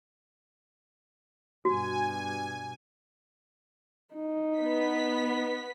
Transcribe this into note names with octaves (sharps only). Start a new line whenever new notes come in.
G2 B2 F#4 G#5
D#4
B3 B6